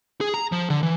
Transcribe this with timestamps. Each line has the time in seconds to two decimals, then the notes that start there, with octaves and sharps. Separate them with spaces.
0.21 G#4
0.34 A#5
0.52 F3
0.70 D3
0.83 E3